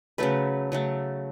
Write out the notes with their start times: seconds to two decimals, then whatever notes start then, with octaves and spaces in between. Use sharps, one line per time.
0.18 C#3 F#3 A3 B4
0.72 C#3 F#3 A3